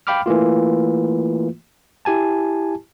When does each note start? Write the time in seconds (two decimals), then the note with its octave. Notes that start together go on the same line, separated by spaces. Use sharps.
0.07 F5 G5 B5 D6 F6
0.26 E3 A3 A#3 F4
2.05 E4 G4 G#5 A5